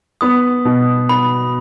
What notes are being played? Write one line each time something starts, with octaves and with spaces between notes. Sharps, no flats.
B3 D#6
B2
B3 B5